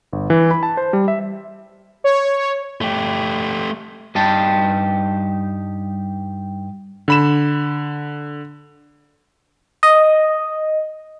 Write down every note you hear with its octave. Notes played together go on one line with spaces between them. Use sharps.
G1
E3
B5
A5
C5
G3
E5
C#5
A3 G4
G2 D#4 G4 A5
D3 B5 E7
D#5